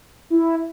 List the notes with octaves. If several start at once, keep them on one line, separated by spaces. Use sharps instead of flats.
E4